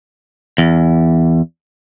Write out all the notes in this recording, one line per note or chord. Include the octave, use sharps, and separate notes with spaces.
E2